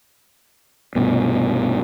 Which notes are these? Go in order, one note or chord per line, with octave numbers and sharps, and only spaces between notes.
C2 G2 B2